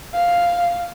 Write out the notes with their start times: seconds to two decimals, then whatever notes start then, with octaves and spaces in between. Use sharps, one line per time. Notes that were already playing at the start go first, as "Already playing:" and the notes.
0.14 F5